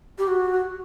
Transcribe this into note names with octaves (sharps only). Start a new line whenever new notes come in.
G4
F#4